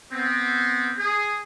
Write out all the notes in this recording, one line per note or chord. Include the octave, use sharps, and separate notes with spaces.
B3 C4
G#4